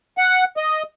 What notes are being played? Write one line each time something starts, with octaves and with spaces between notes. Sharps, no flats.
F#5
D#5